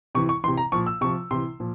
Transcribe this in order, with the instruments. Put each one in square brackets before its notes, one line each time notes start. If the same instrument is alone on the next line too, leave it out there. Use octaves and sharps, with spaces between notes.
[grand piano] C3 E3 C#6
C#6
E3 C6
C3
A#5
A#2 F3 C#6
E6
C3 F3 C#6
C3 E3 C6
A#2 F3